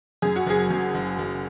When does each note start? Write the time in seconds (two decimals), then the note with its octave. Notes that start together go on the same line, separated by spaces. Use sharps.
0.22 F#2 G#4
0.36 F#4
0.46 F#1 G#4
0.70 F#2
0.95 F#1
1.19 F#1